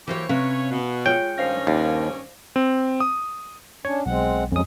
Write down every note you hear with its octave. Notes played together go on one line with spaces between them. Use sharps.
E3 F#3 A#3 G4 C5 C#5
C3 C#4 B4 C#5 F5
B2
G#3 F4 C#5 G5
G2 D#3 C#4 C5 F5 A#6
D#2 D5
C4
D#6
C#4 D4 C#5
B1 G#3 C4 F#5
F2 F#3 G#3 C#4 D#6